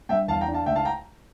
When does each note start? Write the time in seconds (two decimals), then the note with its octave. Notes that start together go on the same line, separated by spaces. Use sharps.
0.09 G2 E5 G5
0.28 E2 F5 A5
0.41 G5 A#5
0.48 D4
0.54 F5 A5
0.66 C#2 E5 G5
0.76 F5 A5
0.85 G5 A#5